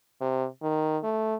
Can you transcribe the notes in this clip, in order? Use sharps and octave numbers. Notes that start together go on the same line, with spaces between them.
C3
D#3
A3